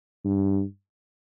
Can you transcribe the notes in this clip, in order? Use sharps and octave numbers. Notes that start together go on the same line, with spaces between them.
G2